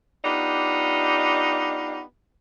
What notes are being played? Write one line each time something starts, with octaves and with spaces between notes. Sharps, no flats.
B3 D4 D#4 F4 G4